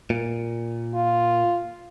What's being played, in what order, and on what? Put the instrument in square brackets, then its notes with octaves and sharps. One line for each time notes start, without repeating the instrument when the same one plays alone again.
[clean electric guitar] A#2
[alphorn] F4